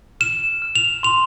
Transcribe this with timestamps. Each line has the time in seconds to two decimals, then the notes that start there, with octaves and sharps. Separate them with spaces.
0.20 F6 E7
0.62 F6
0.75 F7
1.03 C6 F7